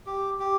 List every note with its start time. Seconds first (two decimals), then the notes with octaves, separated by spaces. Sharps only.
0.06 G4
0.39 G4